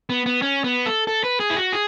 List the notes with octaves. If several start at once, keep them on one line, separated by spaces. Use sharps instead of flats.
B3
B3
C#4
B3
A4
A4
B4
G#4
E4
F#4
G#4